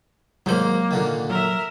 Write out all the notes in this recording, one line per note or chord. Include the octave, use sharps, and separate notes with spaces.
G#2 D#3 F#3 A#3 C5
A#2 D3 D#3
F#3 A#4 E5